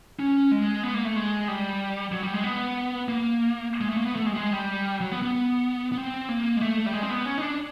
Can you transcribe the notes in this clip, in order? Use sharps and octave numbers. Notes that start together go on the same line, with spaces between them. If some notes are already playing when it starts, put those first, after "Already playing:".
C#4
G#3
B3
A#3
A3
G#3
G3
F#3
G3
G#3
B3
A#3
G#3
A3
A#3
B3
A3
G#3
G3
G#3
G3
F#3
B3
B3
B3
C4
A#3
G#3
A3
G3
G#3
C4
B3
C#4
D#4
D4